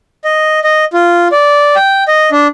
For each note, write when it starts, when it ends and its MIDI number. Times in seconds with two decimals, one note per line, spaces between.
0.24 0.59 75
0.64 0.85 75
0.93 1.28 65
1.32 1.76 74
1.76 2.04 79
2.08 2.30 75
2.32 2.47 62